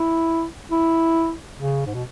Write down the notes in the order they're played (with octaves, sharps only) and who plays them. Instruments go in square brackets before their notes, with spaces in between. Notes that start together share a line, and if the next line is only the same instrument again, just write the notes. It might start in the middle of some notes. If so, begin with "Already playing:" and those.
Already playing: [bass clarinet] E4
E4
C#3
G#2
B2